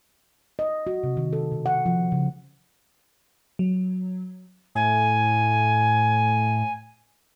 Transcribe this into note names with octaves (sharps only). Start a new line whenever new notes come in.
D#5
F#4
C3
D#3
A4
B2
F#5
F3
C#3
F#3
A2 G#5